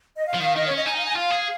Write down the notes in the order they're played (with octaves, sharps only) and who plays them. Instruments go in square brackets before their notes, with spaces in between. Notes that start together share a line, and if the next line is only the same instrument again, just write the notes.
[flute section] D#5
F5
[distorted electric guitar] F3
[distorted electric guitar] D#3 [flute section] F5
[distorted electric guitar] D#3 [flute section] D#5
[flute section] C#5
[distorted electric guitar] C#4 [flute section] D#5
[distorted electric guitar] D#4 [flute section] G#5
[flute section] F5
G#5
[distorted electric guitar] F4 [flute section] F5
[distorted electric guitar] G#4